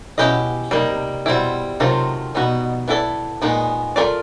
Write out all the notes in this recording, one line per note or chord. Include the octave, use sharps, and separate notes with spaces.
B2 C#4 E4 G4 B4 D#5
C3 G3 A#3 D#4
B2 G3 C4 E4
C3 D#3 F#3 A3 C4 F4
B2 G3 B3 D#4 F#4
B3 E4 A4 D5
A#2 D#3 G#3 B3 D#4
A3 C#4 F4 A#4 D5